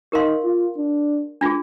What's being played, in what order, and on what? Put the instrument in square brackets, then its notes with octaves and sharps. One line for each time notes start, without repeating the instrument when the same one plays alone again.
[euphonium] D#4 [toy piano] G4 A#4 F5 C6
[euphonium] F4
D4
[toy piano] D4 F4 G#4